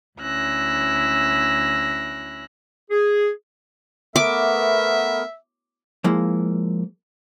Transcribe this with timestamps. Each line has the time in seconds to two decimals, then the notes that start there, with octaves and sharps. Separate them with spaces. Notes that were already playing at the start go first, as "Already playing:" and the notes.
0.20 D2 C#4 E4 E6 F#6 A#6
2.91 G#4
4.16 A3 B3 A#4 E5 D6
6.04 F3 G#3 A#3 E4